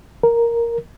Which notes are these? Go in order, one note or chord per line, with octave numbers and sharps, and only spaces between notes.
A#4